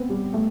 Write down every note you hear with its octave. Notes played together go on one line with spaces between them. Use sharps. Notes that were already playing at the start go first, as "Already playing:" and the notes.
Already playing: B3 C4
G3
A3